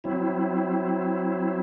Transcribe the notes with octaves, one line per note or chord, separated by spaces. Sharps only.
F#3 C4 E4